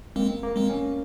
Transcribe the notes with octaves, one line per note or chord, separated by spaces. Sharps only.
G#3 A#3 C4
A#3
G#3 C4
C#4